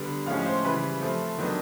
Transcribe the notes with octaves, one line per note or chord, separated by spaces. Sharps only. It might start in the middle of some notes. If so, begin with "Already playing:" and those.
Already playing: D3 G3 B3
A2 F3 G#3 C#4 F5
C5
C#3 E3 G3 B4
F3 A3 C4
D#3 F#3 B3 D4